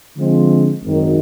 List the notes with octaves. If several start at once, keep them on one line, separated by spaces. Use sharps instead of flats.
D3 F3 G#3 C4
G#1 F#2 D#3 F#3